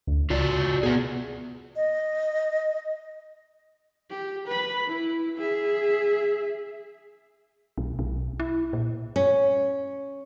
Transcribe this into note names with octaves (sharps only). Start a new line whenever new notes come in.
D2
C#2 F4 F#4 D5
B2 B3 G#4
D#5
G4
B4 B5
E4
G#4 E5
B1
B1
E4
A#2
C#4